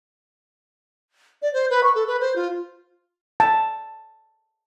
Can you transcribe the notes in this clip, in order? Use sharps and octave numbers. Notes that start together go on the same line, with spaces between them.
D5
C5
B4
C#6
A4
B4
C5
F4
A5